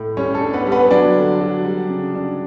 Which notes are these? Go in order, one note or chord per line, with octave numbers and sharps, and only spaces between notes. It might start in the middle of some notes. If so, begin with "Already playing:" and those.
Already playing: A2
G3 C#4 C#5
A4
D4
B3 B4
G3
B3 B4
F#3 D4 D5
D3
F#3
G3
C#3
D4